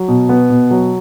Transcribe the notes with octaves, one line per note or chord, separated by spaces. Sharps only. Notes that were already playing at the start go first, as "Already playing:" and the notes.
Already playing: F#3
B2
B3
B2
F#3